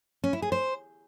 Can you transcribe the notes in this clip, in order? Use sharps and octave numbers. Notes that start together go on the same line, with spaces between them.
C#4
E4
G#4
C5